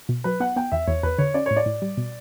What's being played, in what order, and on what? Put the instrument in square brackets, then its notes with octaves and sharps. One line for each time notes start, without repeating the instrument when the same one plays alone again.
[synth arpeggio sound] B2
[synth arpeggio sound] F#3 [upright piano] B4
[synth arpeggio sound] B3 [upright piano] F#5
[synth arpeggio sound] B3 [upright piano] G5
[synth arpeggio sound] E2 [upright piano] E5
[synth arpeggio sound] E2 [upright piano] C#5
[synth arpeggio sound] E2 [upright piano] B4
[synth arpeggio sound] D3 [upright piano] C#5
[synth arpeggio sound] C#4 [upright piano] D5
[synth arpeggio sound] A2 [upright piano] C#5
[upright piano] D5
[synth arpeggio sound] A2
G3
B2